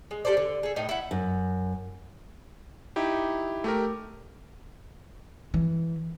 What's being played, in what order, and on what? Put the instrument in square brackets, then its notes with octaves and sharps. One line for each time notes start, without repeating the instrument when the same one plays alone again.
[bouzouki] G#3
G4 A4 C5 D5
D3
G#4 A4
A2 D#4 G5
E4 F#5
[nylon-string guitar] F#2
[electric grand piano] D#4 E4 G4
A3 G4 A#4
[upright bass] E3